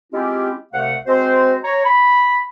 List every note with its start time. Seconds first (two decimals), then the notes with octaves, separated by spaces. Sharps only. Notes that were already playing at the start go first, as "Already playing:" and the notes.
0.13 G#3 C4 C#4 E4 F4 G4
0.73 C2 C3 A3 F5 F#5
1.07 G#3 C4 F#4 C5
1.64 C#5 A#5
1.85 B5